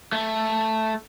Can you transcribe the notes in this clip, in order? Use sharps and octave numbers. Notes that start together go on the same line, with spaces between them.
A3